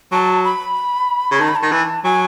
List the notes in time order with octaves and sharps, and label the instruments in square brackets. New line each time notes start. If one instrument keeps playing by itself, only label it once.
[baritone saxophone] F#3 [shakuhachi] A5
[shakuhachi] B5
[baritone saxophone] C#3
[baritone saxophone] D#3 [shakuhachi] A5
[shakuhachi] B5
A5
[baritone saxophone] D#3
E3
[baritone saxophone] F#3 [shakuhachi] G#5